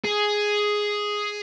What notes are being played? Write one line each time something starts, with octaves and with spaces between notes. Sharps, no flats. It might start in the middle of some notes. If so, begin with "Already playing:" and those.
G#4